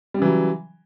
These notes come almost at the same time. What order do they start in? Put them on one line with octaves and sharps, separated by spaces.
G3 C#3 E3 F#3